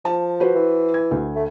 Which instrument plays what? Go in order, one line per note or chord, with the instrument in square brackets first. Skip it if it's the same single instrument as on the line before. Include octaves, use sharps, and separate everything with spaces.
[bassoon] F3 [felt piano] A5
[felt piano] F#4 B4 C5
[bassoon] E3
[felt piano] G#6
D2
[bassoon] A3